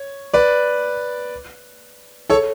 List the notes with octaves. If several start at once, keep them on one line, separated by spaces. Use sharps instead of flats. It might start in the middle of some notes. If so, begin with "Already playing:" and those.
Already playing: C#5
B4 D5
A4 C#5